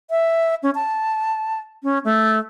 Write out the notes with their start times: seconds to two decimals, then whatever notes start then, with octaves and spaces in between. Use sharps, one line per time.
0.10 E5
0.63 C#4
0.75 A5
1.83 C#4
2.05 A3